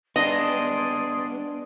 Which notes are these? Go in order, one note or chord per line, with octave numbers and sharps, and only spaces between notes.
B3 D4 G#4 D5 D#5 C6